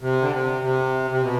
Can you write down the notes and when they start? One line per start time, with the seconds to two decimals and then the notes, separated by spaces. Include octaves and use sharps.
0.01 C3
0.22 D3
0.31 C3
0.62 C3
1.10 C3
1.22 B2